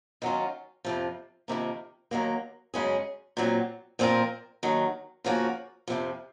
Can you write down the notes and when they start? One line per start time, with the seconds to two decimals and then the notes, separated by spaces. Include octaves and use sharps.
0.22 D#3 F#3 C#4 F4
0.85 F2 C3 F3
1.48 F2 C3 D#3 A#3
2.11 D#2 D#3 F#3 A#3
2.74 F#2 C#3 G#3 C#4 G#4
3.37 A#2 F#3 C4
3.99 A#2 F3 C4 F4 A#4
4.63 D#2 D#3 F#3
5.24 C#3 F3 A#3 C#4 F#4
5.87 F2 C3 F3